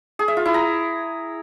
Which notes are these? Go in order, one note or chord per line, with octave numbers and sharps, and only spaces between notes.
G#4
E5
F4
E4
A#5